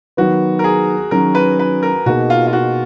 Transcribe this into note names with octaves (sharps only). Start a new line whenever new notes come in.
D#3 F#3 B3 F#4
A#4
G#4
D#3 F#3 C#4 A#4
B4
B4
A#4
B2 A#3 D#4 F#4 G#4
F4
F4
F#4